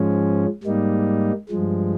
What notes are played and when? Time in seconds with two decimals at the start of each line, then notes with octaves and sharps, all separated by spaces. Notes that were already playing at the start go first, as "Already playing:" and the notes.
Already playing: G#2 F3 G#3 C#4
0.64 G#2 G3 A#3 D#4
1.49 G2 F3 G#3